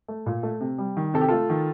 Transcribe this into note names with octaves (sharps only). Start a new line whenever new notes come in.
A3
A#2
A3
C3
G3
D#3
C3 A4
G4
A3 F4 A4
D#3